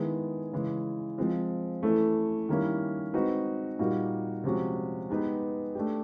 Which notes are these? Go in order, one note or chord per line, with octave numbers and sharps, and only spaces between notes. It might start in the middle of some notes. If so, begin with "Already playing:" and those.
Already playing: D#3 G#3 B3 E4 G#4
C#3 E3 G#3
F3 G#3 C4
E3 A3 C#4 E4 A4
D#3 G3 A#3 C#4 E4
G#3 C4 D#4 F#4 B4
A#2 G3 A#3 D#4 F#4
C3 F3 G#3 C#4 F#4
G#3 B3 D#4 G4 B4
A3 D4 G4